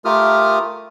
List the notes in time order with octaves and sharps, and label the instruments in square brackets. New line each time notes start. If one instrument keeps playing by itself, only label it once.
[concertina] A3 F4 G4 A#4 D#6 F6